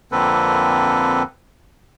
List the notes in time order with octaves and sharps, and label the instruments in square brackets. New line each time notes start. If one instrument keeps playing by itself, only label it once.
[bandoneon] F2 D3 A#3 C4 A4 B4